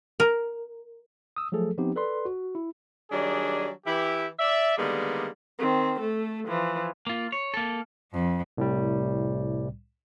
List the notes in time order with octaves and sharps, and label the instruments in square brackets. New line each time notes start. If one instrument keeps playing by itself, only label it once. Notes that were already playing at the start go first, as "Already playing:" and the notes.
[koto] A#4
[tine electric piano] D#6 E6
F3 F#3 A3 G#4 A4
F3 B3 C4 D#4 G4
A4 B4 D5 C6
F#4
E4
[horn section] D#3 F#3 G3 D4 G#4
E3 E4 G4
D5 E5
D3 D#3 G3 G#3 A#3 B3
[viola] D#3 C4
A3 A4
E3 F3
[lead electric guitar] A#3 F4
C#5
A#3 A4
[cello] F2
[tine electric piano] C2 A2 G3